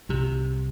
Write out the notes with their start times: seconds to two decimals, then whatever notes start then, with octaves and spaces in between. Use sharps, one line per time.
0.09 C2 C3